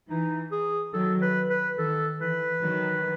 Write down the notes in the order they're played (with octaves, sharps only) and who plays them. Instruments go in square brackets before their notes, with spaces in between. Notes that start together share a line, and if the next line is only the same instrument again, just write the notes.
[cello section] E3 [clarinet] D#4
[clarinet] G#4
[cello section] D#3 F#3 [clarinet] A4
[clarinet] B4
B4
[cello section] D#3 [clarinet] A4
[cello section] E3 [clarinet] B4
[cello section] D#3 F#3